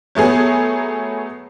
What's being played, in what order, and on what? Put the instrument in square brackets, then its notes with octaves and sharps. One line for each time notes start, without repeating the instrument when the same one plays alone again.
[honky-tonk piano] F#3 A3 B3 G#4